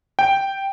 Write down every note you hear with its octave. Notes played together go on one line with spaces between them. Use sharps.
G5